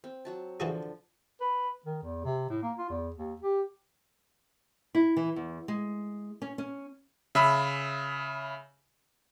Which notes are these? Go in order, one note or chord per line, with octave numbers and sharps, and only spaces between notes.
C4
F#3 F#4 A5
D3 E3 F3 F#4 G#4
B4
D#3
E2
C3
A2
A#3
F4
E2
D#2
G4
E4
E3
E2
G#3
C#4
C#4
C#3 E5 B5 E6